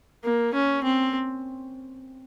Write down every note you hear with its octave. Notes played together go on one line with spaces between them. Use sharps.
A#3
C#4
C4